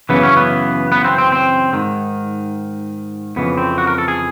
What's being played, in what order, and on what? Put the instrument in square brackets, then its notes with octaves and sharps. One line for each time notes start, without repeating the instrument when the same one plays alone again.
[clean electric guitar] F#2 C#3 E3 B3
C#4
B3
B3
C4
C4
C4
G#2 D#3
F2 C#3 E3 B3
C4
F#4
A#4
A4
G#4